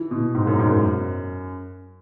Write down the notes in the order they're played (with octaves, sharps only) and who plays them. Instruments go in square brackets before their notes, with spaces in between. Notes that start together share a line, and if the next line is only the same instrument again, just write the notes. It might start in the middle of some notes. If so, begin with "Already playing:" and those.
Already playing: [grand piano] E3
B2
G#2
F#2
G#2
F#2